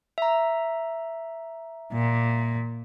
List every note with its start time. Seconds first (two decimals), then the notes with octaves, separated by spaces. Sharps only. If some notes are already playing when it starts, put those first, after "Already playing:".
0.18 E5 A#5
1.93 A#2